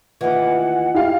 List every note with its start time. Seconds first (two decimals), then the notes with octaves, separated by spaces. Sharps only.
0.21 D#2 E3 F4 D#5 F#5 G#5
0.94 E4 G4 F5